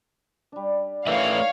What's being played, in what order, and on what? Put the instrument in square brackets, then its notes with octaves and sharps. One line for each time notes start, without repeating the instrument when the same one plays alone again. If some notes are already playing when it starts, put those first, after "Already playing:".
[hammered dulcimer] G3 D4
[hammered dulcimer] D#3 D5 [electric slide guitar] A3 B4 E5 [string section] C#5 F5